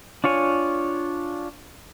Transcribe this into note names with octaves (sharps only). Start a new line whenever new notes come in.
D4 F4 C#5 G#5